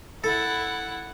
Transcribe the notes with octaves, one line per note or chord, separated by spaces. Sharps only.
E4 A4 F#5